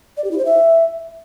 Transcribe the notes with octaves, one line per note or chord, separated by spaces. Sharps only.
D5
G4
E4
C5
E5